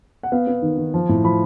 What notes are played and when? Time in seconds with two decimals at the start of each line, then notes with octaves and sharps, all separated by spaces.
0.23 F#5
0.32 B3 F5
0.47 B3
0.62 D#3
0.78 D#3
0.94 F3
1.09 A2
1.24 F3 B5